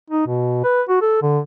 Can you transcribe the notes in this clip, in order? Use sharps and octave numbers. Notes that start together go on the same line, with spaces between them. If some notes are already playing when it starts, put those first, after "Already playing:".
D#4
B2
B4
F#4
A4
D3